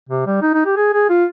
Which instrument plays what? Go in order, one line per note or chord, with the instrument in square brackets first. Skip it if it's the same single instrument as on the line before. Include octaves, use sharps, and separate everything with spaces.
[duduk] C3
G3
D#4
D#4
G4
G#4
G#4
F4